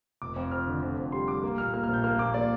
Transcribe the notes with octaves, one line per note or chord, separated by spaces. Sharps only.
F1 D6
F2
F2 F6
D3
F2
F2
G3 C6
G3 D6
A#3
A#2 F6
A#3 F6
F6
A#1
G6
A#3 F6
A#2 D6
A#3 D5